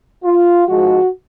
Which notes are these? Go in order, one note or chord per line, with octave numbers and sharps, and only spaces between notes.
F4
G#2 F3 G#3 F#4